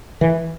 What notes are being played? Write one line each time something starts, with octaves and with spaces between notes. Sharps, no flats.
E3